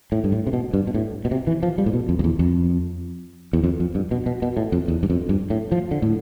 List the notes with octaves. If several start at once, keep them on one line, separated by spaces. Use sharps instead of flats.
A2
G2
A2
C3
B2
G2
B2
A2
B2
C3
E3
F3
G3
A2
B2
F2
F2
E2
F2
E2
F2
F2
G2
B2
B2
B2
A2
F2
E2
G2
F2
G2
A2
F3
D3
A2